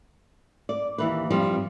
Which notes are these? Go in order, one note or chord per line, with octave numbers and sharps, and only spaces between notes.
D5
D#2 E3 B4
G2 F3 G3 C4